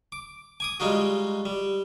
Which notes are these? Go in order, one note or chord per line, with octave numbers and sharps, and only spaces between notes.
D6
G#5 D6 D#6
G3 G#3 D#4 F4 F#4
G3